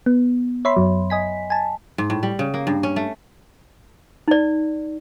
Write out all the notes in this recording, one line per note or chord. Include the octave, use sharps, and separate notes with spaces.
B3
C#5 E5 B5 C6
F#2 F#3
D#5 G#5 B6
G#5 A5
G#2
A2
G3
C#3
A#3
G2
C#4
A3
D#4 D5